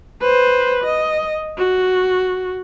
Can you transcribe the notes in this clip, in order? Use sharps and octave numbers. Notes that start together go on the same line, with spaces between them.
B4 C5
D#5
F#4